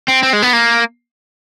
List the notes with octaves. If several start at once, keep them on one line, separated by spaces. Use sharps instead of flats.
C4
C4
G#3
B3
A#3